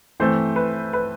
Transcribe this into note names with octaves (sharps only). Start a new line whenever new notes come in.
E3 A3 C4 C5
B4
B4